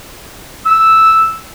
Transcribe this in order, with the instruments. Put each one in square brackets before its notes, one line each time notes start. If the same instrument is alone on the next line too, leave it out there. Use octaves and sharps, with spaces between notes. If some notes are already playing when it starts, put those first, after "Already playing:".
[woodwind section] E6